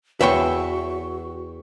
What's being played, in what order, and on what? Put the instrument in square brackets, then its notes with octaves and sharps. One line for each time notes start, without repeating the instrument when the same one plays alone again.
[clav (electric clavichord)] E2 [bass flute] F#4 [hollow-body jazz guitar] B4 C#5 G5 [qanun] E5 C#6